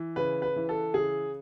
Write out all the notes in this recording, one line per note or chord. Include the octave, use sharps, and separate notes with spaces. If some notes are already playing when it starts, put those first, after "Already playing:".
Already playing: E3
C#3 B4
B4
E3
A4
C#3 G#4